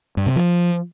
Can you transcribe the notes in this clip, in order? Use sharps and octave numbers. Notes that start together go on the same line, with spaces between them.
G2
C3
F3